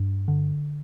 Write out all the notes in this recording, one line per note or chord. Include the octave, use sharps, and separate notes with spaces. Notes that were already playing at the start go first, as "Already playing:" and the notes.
Already playing: G2
D3